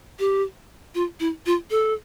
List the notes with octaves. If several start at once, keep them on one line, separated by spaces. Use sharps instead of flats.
G4
F4
E4
F4
A4